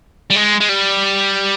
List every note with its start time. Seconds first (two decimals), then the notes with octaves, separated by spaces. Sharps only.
0.30 G3
0.36 G#3
0.60 G#3
0.69 G3